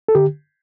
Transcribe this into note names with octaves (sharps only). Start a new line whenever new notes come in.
A4
D3 G4